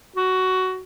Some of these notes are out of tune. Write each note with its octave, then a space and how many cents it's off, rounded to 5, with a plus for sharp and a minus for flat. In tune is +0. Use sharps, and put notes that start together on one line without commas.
F#4 +15